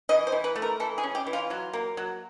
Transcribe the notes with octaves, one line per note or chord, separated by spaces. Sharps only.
E3 D#5
C5
E3
B4
A3
A#4
E3 A4
G#4
C#4
G4
E3
F4
F#3 F4
A#3
F#3